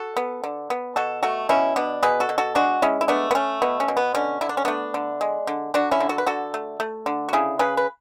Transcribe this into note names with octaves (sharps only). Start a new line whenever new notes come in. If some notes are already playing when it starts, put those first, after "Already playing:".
Already playing: F#4 A4
B3
D3
B3
B2 F#4 A4
A3 F#4 A4
B2 C#4 E4
B2 B3 D4
B2 G#4 B4
F#4 A4
B2
F#4 A4
G#3 D4 F#4
G#3 C#4 E4
E4
A3 B3 D4
B3
A3 C#4
B2 B3
C#4
B2
B3
D3 C#4
D3 E4
D4
C#4
A3 B3 D4
D3
G#3
D3
D3 D4 F#4
C#4 E4
D3
F#4 A4
B4
D3 F#4 A4
A3
A3
D3
F#4
C#3 E4 G#4
C#3 G#4 B4
B4